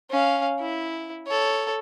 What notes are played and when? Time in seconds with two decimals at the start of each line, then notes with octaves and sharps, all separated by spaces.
0.10 C#4 F5
0.59 E4
1.26 A4 C#5